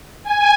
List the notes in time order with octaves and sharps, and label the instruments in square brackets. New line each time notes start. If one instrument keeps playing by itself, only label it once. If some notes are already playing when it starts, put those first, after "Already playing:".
[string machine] G#5